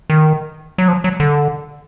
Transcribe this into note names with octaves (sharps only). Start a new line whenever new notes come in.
D#3
F#3
F3
F#3
D3